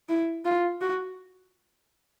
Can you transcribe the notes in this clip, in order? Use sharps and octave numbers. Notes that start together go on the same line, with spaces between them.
E4
F4
F#4